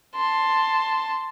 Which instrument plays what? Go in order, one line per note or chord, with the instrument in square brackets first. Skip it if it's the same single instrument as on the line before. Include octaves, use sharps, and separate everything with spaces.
[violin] A5 C6